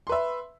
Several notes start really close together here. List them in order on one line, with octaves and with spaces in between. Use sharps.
C6 B4 E5